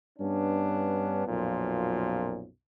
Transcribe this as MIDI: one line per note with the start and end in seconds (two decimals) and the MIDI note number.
0.19 1.24 43
0.19 1.24 59
0.19 1.24 61
0.19 1.24 62
1.27 2.47 35
1.27 2.47 42
1.27 2.47 46
1.27 2.47 53